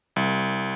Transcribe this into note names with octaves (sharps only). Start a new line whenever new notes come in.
C2